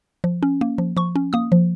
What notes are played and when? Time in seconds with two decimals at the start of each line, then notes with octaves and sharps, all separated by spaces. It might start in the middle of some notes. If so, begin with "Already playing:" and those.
0.24 F3
0.43 C#4
0.61 A#3
0.78 F3
0.97 F3 C#6
1.16 C#4
1.33 A#3 D#6
1.52 F3